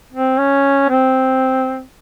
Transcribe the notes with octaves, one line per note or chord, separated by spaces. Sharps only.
C4
C#4
C4